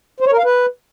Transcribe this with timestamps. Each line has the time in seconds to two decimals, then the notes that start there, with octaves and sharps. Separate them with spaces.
0.20 C5
0.26 C#5
0.32 A#4
0.38 F5
0.44 B4